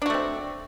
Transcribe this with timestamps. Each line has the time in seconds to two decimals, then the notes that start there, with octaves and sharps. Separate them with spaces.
0.02 D4
0.06 F#4
0.10 A3
0.14 C4